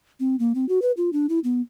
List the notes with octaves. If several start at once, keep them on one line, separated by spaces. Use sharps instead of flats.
C4
A#3
C4
F#4
B4
F4
D4
E4
B3